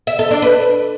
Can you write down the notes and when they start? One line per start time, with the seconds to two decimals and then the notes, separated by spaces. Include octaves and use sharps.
0.07 E5
0.19 A4
0.31 D4
0.42 B4